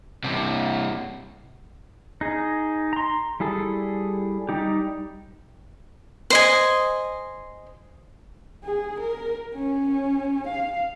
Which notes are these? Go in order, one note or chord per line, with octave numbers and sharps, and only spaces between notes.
G2 C3
D#4 G#4
A#5 C6
G3 E4 G#4 A4
G3 D#4 G4
C5 D#5 G#5
G#4
A#4
C#4
F5